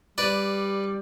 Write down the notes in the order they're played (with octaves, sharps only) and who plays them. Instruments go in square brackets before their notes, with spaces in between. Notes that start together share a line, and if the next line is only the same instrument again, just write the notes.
[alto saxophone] G3 [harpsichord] B4 D5